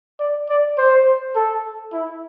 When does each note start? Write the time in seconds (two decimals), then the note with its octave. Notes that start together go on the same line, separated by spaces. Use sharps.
0.20 D5
0.49 D5
0.78 C5
1.35 A4
1.93 E4